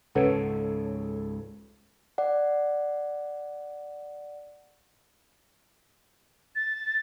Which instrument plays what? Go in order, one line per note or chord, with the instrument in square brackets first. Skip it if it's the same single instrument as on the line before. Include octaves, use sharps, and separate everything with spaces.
[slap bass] C#2 G#2 C#3 [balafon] C#4 B4 F#5 [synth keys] A4 C#5
[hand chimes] D5 F#5
[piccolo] A6